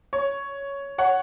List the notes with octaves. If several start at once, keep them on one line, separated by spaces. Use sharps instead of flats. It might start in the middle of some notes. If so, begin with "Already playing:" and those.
C#5
C#5 F#5